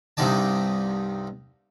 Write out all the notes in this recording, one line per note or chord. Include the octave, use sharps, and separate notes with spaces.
C2 G2 C3 D#4 D5 A5